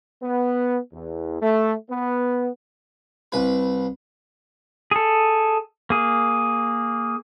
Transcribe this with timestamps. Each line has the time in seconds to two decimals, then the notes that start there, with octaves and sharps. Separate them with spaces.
0.23 B3
0.93 E2
1.42 A3
1.90 B3
3.32 C2 B4
4.91 G#4 A4
5.90 A#3 G#4